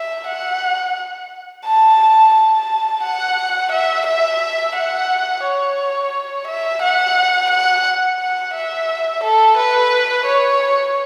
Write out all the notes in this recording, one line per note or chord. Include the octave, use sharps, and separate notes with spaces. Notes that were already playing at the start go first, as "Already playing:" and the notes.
Already playing: E5
F#5
A5
A5
F#5
E5
E5
F#5
C#5
E5
F#5
F#5
F#5
E5
A4
B4
C#5